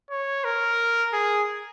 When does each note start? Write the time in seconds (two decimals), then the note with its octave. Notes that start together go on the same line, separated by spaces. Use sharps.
0.11 C#5
0.44 A#4
1.13 G#4